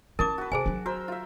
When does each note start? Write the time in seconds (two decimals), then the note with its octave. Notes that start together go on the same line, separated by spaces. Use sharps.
0.19 C#4 E4 A#4 A5 D6
0.38 F#4 B4
0.52 C3 G#4 C5 G#5
0.66 F#3 D4
0.86 F#4 A#4 C5 E6
1.08 F4 E5